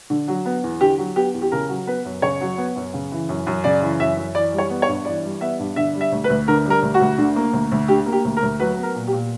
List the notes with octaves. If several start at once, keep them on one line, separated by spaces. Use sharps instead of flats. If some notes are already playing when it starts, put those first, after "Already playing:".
D3
F#3
B3
E2
D3 G4
F#3
B3 G4
E2
G4
C#3 A#4
F#3
B3 B4
F#2
C#3 C#5
F#3
B3
F#2
C#3
E3
F#2
F#2
C#3 D5
E3
F#2 E5
F#2
E3 D5
G3
C#5
B3
C#5
G2
E3 D5
G3
B3 E5
G2
D3 E5
G3
E5
D2
B4
D2
D3 A#4
G3 A#4
D2
F#4
D2
D3
A#3
D2
D2
D3 G4
A#3
G4
D2
A#4
D2
F#3 B4
B3
A#4
A#2
G4
A#2